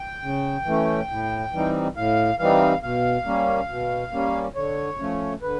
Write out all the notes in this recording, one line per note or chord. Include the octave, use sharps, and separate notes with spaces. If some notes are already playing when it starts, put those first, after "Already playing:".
Already playing: G5
C#3
E3 A3 C#4
A2
E3 G3 C4 D#4
A2 F5
E3 G3 C4 D#4 F5
B2 F5
G3 A#3 C#4
B2
G3 A#3 C#4
D3 C#5
F3 A3 C#4
D3 B4